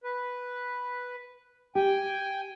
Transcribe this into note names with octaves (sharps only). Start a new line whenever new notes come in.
B4
G4 G5 G#5